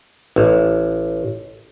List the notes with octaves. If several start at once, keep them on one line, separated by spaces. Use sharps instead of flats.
A1